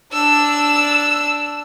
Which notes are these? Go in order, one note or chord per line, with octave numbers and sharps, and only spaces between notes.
D4 E6